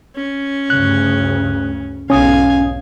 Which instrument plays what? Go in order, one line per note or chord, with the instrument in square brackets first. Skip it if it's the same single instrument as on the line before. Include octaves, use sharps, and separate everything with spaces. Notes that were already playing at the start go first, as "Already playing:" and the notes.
[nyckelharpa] C#4
[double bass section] D2 G2 C#3 [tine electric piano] F#6
[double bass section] B1 E2 G#2 [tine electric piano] C#4 D#6 [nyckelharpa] F5 G#5